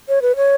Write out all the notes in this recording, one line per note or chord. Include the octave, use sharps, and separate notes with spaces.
C#5
B4
C#5